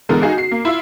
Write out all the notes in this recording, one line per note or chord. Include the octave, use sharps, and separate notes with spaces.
D3 E3 G#3 B3 A4 A#4
D#4 F#4 G#4 D#5 F5
F#4 C7
A#3
E4 F4